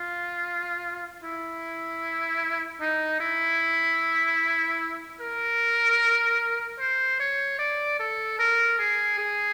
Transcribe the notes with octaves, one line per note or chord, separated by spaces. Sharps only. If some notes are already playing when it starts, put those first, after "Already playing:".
Already playing: F4
E4
D#4
E4
A#4
C5
C#5
D5
A4
A#4
G#4
G#4